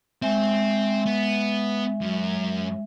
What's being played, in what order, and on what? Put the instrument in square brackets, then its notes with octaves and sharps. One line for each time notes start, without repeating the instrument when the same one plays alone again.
[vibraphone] G#3 E5 [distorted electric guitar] C4
[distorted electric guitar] B3
F#2